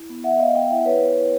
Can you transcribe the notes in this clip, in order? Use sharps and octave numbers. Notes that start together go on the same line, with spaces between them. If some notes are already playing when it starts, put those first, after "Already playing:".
Already playing: E4
B3
B3 E5 F#5
B3 D#5 F5
B3 F5 G5
E4 E5 F#5
E4 B4 C#5
B3
E4